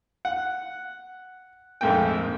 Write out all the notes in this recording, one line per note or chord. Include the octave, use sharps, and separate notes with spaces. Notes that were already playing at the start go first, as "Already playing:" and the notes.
F#5
A#1 F2 G#2 A3 A#3 G5